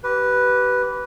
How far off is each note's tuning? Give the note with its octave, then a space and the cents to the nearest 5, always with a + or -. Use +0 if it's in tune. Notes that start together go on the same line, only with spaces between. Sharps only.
G4 -30 B4 +0